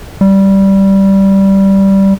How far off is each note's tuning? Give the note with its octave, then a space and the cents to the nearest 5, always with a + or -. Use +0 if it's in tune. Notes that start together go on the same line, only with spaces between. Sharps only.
G3 -10